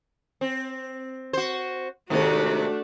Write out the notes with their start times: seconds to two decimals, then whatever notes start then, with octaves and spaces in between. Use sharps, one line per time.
0.41 C4
1.33 F#4 C5
2.10 G#2 C3 D#3 A3 D4 F#4